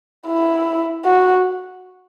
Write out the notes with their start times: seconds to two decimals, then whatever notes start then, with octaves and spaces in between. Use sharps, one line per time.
0.27 E4
1.05 F#4